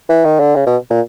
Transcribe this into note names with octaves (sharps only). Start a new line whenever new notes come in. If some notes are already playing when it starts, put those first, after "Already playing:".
E3
D#3
D3
C#3
B2
A#2